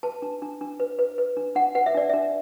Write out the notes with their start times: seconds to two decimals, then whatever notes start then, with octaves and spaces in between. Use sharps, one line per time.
0.03 B4 A5
0.22 D4
0.42 D4
0.61 D4
0.80 B4
0.99 B4
1.18 B4
1.37 D4
1.55 D4 F#5
1.75 B4 F#5
1.86 E5
1.94 D4 D5
2.09 D4 E5